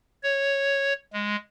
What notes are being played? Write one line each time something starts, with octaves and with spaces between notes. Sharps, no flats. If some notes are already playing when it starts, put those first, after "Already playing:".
C#5
G#3